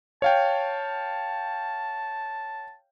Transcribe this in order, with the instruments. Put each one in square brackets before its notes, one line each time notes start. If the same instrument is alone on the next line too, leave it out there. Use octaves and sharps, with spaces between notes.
[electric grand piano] C#5 F5 G5 [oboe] A5